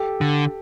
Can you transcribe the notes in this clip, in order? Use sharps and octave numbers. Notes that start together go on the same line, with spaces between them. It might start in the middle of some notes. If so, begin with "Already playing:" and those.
Already playing: G4 A4
D3